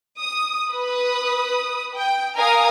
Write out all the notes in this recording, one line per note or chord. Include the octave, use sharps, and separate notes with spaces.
D#6
B4 D#6
G5
A#4 F5 G#5 A#5 D#6